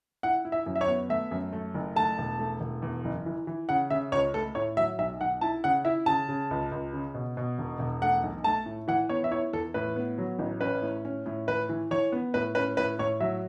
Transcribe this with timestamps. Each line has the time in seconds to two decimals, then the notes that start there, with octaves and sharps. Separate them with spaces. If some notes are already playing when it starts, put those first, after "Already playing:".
0.23 E4 F#5
0.45 E4
0.52 E5
0.66 F#2
0.76 E5
0.81 C#5
0.88 B3
1.09 A3 E5
1.31 F#2
1.53 A3
1.74 F#1
1.96 A3 A5
2.18 E1
2.39 A3
2.60 E1
2.82 E2
3.05 F#1
3.26 E3
3.47 E3
3.69 C#3 F#5
3.90 C#3 E5
4.12 C#2 C#5
4.34 A3 A4
4.55 A2 C#5
4.77 F#3 E5
4.98 B1 E5
5.21 B1 F#5
5.41 E4 A5
5.64 C#3 F#5
5.85 E4 E5
6.06 C#3 A5
6.29 C#3
6.51 C#2
6.72 C#2
6.93 C#3
7.15 B2
7.37 B2
7.58 E1
7.79 E1
8.01 A3 F#5
8.23 B1
8.44 A3 A5
8.66 A2
8.88 E3 F#5
9.09 B3 C#5
9.24 E5
9.31 E4 C#5
9.53 E2 A4
9.74 A2 B4
9.96 B3
10.18 F#3
10.39 A1
10.61 C#4 B4
10.82 A2
11.05 C#4
11.26 A2
11.47 E3 B4
11.69 E3
11.91 E3 C#5
12.12 B3
12.34 A2 B4
12.55 C#4 B4
12.77 A2 B4
12.99 A2 C#5
13.20 F#3 E5